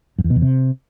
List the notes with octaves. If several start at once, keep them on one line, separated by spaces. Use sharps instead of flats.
F#2
E2
B2
E2
C3